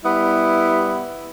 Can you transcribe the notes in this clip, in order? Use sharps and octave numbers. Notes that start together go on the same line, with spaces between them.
G3 B3 E4